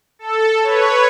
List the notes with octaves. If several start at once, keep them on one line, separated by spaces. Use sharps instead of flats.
A4
B4 C#5